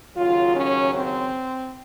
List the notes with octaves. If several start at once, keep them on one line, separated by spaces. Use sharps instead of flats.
D#2 C#3 F#3 F4
C#4
C4